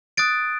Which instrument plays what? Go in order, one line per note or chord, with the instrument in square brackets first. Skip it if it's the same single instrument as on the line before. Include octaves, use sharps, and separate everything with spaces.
[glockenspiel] D#6 F#6 A6 D7